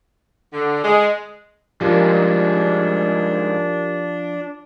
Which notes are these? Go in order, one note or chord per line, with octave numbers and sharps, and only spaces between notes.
D3
G#3
G#2 F3 G3 D4 G4 A#4